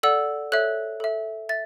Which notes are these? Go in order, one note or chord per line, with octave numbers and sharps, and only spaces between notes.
A4 D5 F#5 E6
A4 C#5 E5 F#6
A4 E5
E5 A6